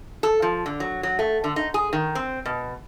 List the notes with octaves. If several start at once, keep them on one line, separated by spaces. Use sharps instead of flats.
A4
F3
D3
F#3
F#3
A3
D3
D#4
G#4
D#3
C4
B2